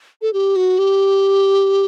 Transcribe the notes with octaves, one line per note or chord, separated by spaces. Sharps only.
A4
G4
F#4
G4